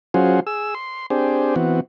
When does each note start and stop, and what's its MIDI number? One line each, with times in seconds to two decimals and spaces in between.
0.14 0.40 54
0.14 0.40 61
0.14 0.40 65
0.14 0.40 66
0.14 0.40 68
0.14 0.40 72
0.47 0.74 68
0.47 0.74 88
0.75 1.06 84
1.10 1.55 60
1.10 1.55 62
1.10 1.55 67
1.10 1.55 68
1.10 1.55 72
1.56 1.80 52
1.56 1.80 59
1.56 1.80 60
1.56 1.80 66